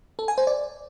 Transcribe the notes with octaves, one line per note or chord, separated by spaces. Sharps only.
A4
G#5
C5
D5